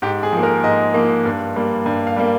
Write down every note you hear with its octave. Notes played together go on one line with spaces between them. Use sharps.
G#2 G4
G#4
F3 A#3
A#4
G#2 D#5
F3 A#3
G2
G3 A#3
G2
F5
G3 A#3